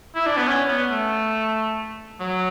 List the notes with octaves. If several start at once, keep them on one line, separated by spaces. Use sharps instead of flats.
E4
D4
B3
C#4
B3
A3
F#3